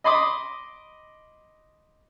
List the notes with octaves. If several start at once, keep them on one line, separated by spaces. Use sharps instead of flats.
D#5 B5 C6 D6 D#6